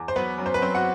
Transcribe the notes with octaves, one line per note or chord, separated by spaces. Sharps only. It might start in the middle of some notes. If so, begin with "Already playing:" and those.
Already playing: E2
C5
F#3 B3 B4
F#2
C5
B4
F#3 C4 C5
F#4 F#5